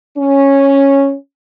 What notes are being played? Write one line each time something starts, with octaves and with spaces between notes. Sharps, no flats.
C#4